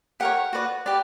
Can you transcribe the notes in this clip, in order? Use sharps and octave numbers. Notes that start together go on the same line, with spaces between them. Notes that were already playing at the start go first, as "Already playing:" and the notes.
G4 A#4 C#5 F#5
F#4 B4 D5
G4 B4 D5